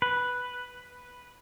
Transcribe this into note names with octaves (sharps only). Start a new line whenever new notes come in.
B4